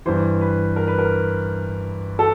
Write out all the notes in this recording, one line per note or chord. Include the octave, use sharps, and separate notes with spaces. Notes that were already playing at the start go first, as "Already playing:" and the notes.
G2 E3 C5
B4
A#4
B4
A#4
A4